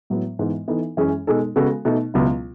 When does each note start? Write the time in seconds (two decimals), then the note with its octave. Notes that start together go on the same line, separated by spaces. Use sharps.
0.10 A2 F#3 B3
0.39 G#2 E3 G#3 B3
0.68 E3 B3 D#4 A4
0.97 F#2 E3 G#3 C#4 G#4
1.27 B2 G#3 D#4 A4
1.56 C#3 G#3 B3 F#4 A4
1.85 B2 A3 D#4
2.14 C#2 B2 F#3 B3 E4